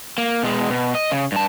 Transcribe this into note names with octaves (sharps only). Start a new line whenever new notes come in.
A#3
B2 G#3
B2
D#5
C#3
G2 A5